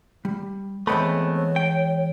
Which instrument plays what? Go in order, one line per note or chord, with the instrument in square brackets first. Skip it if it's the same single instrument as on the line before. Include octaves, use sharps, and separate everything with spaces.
[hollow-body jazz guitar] G3
[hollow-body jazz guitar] E3 G#3 B5 [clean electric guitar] A3 B3 C4 [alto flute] C#5
[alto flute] C#5
[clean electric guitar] G5